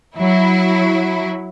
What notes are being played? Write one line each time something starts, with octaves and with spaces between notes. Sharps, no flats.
F#3 E4